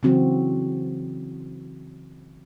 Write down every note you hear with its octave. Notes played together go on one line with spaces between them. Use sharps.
C#3 E3 F#3 C4 F#4